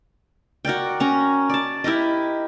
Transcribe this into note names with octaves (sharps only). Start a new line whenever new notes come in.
F#4 A#4 D5 G5
C#4 A#5
D5 A5
E4 G4 A#4 D#5